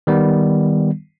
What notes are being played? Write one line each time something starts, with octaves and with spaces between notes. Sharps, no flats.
D#3 G3 B3